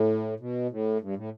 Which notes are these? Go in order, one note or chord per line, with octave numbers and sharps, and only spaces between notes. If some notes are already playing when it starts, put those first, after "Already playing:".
Already playing: A2
B2
A2
G2
A2